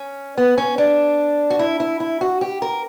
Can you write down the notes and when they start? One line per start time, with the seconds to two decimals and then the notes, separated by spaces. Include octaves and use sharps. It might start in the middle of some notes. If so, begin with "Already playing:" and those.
Already playing: C#4
0.38 B3
0.58 C#4
0.78 D4
1.50 F#4
1.59 E4
1.80 E4
2.00 E4
2.21 F#4
2.41 G4
2.62 A#4